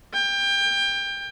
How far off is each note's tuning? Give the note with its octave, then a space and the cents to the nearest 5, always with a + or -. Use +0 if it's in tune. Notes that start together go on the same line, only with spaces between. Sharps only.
G5 +25